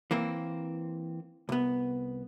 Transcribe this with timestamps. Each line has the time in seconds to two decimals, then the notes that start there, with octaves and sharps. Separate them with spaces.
0.11 E3 A#3 C4
1.49 C2 B3